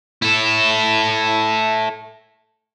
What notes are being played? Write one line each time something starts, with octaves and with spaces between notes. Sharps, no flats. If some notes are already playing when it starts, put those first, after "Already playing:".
E4 A4